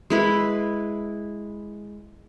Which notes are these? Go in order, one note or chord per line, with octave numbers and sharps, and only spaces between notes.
G#3 E4 B4